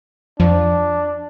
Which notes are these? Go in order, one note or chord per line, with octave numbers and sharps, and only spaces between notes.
F2 F3 D4